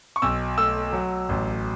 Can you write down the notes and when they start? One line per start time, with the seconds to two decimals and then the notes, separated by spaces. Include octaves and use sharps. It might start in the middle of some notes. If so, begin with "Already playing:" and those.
0.16 C#6
0.22 B1 E6
0.58 A3 E6
0.93 F#3
1.29 A1